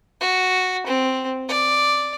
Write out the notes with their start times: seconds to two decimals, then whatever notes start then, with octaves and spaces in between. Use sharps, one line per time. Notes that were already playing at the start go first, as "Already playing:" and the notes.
0.21 F#4
0.87 C4
1.49 D5